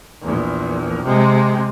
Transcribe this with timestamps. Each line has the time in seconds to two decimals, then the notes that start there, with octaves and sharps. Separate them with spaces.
0.21 A#1 E2
1.04 C3 G#3